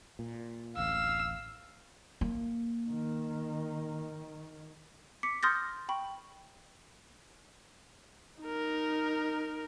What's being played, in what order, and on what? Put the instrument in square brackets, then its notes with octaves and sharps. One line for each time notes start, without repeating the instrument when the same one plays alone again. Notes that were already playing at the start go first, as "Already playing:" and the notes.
[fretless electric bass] A#2
[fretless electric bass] D1 A1 [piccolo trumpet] F5 [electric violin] E6
[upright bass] A#3
[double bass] D#3
[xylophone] D6 B6 C#7
C6 D#6 F6 G6 A6 A#6
G5 B5 C#6
[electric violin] D#4 A#4